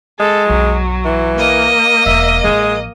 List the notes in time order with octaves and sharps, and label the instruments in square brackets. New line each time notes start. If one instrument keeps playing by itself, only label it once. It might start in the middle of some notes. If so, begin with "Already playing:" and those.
[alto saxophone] G#3 [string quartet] A4
[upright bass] B1 F2 [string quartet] F#3
[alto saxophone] E3
[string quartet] A#3 D#5
[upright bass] E1 E3 [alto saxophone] E5
[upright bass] A1 F3 [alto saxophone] G#3